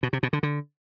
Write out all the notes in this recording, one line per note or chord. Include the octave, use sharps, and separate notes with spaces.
B2
C3
B2
D3
D3